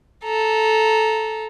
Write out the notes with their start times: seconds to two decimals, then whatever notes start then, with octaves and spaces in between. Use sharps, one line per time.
0.24 A4 A#5